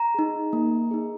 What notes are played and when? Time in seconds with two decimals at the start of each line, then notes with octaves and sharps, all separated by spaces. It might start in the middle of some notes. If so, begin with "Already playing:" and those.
Already playing: A#5
0.15 D#4 G#4
0.53 A#3
0.91 D#4 G#4